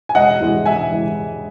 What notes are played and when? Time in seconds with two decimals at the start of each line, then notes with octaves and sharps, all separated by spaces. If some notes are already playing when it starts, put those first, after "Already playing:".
0.09 G#5
0.15 E1 D#5 F#5
0.40 E2 C3 E3 G#3
0.65 E1 E5 G#5
0.91 C3 E3 G#3